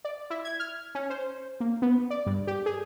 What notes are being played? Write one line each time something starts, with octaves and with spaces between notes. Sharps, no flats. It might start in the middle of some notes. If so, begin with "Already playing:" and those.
D5
E4
G#6
F6
C#4
C5
A#3
B3
D5
G2
G4
G#4